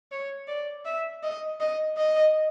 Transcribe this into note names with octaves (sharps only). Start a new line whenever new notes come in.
C#5
D5
E5
D#5
D#5
D#5